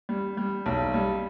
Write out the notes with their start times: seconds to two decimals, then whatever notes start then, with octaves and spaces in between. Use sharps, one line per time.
0.09 G3
0.37 G3
0.66 B1
0.94 G3